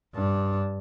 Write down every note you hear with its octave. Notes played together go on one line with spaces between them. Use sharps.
G2 D4